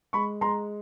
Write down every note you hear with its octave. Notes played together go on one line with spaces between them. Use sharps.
G#3 B5 C#6
G#3 A#5 C6